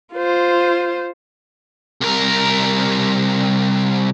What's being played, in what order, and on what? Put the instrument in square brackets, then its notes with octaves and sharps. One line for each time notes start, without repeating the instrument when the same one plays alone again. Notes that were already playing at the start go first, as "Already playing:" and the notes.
[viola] F4 C5
[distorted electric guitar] C2 A#4